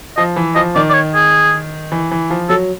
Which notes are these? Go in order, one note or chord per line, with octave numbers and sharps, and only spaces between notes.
F3 D#5
E3
F3 D#5
D#3 D5
D5
C#5
G#4
E3
E3
F3
F#3 A4